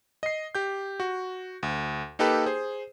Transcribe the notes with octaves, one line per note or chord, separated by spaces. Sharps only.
D#5 C7
G4 G6
F#4
D2
A#3 D#4 G4 A4 B4 G5
G#4 C5